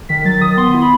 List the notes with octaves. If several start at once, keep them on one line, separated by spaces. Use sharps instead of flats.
D#3 B6
F#3 A6
D#3 D#6
B3 C6
E4
B5